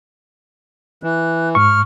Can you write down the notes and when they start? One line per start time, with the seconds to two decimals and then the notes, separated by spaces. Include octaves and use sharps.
1.03 E3 F#6
1.55 G#2 C#6 F6